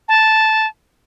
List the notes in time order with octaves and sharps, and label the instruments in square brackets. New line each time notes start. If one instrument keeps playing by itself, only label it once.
[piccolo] A5